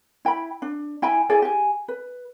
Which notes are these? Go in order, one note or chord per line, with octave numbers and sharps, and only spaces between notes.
E4 G5 A5 B5
D4
E4 G5 G#5 B5
E4 G#4 D5 G#5
G4 G#5
B4